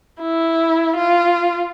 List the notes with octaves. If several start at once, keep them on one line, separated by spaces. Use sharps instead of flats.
E4
F4